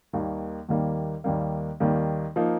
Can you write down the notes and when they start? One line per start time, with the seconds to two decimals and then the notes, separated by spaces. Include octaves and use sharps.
0.13 D#2 D#3 G3 A#3
0.69 D#2 D#3 G3 A#3
1.24 D#2 D#3 G3 A#3
1.80 D#2 D#3 G3 A#3
2.36 F3 A#3 D#4